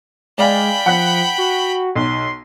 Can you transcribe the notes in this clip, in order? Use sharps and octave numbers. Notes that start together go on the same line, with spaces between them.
G#3 D5 F5 G5 G#5 B5
F3 F#5 F#6 B6
F#4
B1 C6